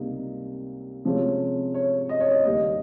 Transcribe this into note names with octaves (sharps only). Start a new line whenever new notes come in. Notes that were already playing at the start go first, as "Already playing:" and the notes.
Already playing: C#2 C3 G3 A#3 D#4
C3 F3 G#3 C#4
C#5
D#5
C#5
D#5
D#2 C#3 G3 A#3 D#5